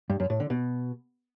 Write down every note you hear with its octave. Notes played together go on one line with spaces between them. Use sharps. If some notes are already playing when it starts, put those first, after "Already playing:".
G2
F#2
A2
D3
B2